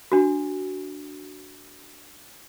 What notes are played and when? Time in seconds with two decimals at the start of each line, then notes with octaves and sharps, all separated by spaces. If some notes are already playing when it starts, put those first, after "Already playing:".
0.12 D4 F#4